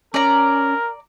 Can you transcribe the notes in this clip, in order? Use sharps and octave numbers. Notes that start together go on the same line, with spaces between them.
C#4 A#4 D5 A#5